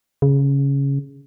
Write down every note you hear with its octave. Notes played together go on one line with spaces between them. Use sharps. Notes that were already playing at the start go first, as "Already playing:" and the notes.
C#3